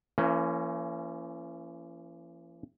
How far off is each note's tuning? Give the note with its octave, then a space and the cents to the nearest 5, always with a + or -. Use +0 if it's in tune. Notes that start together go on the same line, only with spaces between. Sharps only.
E3 +40 A#3 -20 C#4 +0